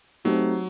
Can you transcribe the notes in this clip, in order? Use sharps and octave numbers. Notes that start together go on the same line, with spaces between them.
F#3 A3 C4 D#4 G4